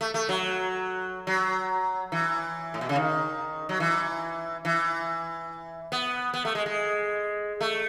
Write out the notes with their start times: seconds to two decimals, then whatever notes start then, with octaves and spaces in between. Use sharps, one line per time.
0.01 A3
0.14 A3
0.29 F#3
1.27 F#3
2.12 E3
2.74 A2
2.81 B2
2.89 C#3
2.96 D#3
3.69 F#3
3.80 E3
4.65 E3
5.92 B3
6.34 B3
6.45 A3
6.55 G#3
6.66 G#3
7.61 A3